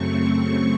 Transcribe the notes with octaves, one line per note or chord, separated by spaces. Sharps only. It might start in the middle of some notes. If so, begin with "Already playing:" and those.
Already playing: F#2 C#3 F#3 A3 C4 C#6